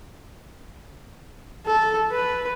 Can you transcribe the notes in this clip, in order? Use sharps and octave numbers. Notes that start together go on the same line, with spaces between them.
A4
B4